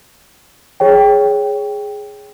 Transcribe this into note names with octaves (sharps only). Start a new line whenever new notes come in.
G#4 C#5 G5